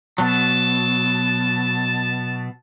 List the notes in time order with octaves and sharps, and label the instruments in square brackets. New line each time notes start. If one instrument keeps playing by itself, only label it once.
[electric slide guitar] B2 F#3 [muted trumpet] A5